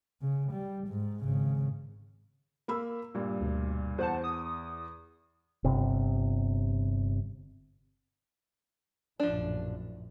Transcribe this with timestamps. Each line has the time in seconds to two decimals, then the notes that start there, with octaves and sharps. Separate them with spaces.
0.22 C#3
0.52 G3
0.88 G#2
1.24 G#1 C#3
2.68 A#3 B5 E6
3.14 G2 A#2
3.40 D2 B2
3.98 E2 C5 F#5 A5
4.24 D#6
5.65 G1 C3
9.20 A#1 F#2 A2 F3 D4